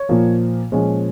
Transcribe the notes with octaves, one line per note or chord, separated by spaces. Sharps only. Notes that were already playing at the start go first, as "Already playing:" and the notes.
Already playing: C#5
A#2 F3 A#3
A#2 F3 G#3 C#4